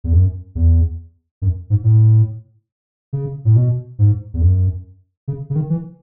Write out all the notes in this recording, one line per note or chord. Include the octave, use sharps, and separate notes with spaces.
E2
F#2
E2
F#2
G#2
A2
C#3
A2
B2
G#2
E2
F#2
C#3
C#3
D#3
E3